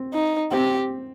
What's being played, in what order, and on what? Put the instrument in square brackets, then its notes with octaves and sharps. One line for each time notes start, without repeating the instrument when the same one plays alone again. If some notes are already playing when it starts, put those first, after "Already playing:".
Already playing: [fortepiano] C4
[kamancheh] D#4
[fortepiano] C4 [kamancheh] G4